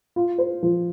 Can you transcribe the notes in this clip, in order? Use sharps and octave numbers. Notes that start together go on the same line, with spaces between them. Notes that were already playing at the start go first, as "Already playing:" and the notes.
F4
C5
F3